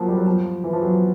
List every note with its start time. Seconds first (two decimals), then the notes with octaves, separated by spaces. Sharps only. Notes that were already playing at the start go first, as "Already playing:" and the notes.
Already playing: F3 F#3 A#3
0.08 G3
0.18 F#3
0.27 F3
0.64 E3
0.73 F3
0.83 F#3